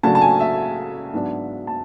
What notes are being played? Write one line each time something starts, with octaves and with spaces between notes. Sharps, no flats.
C#3 F#3 A3 D4 A5
A5
G#5
E5
G#2 F#3 B3 D4
A5